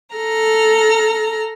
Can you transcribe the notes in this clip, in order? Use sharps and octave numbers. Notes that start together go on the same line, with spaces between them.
A4 A#5 F6